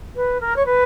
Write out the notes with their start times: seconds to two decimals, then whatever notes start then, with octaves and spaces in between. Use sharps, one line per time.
0.16 B4
0.41 A#4
0.56 C#5
0.66 B4